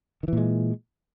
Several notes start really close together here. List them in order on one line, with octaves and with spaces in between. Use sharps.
D#3 E3 A#2 G#3